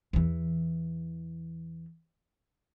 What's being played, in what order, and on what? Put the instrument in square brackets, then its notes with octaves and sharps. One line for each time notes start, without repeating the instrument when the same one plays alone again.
[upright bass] E2 E3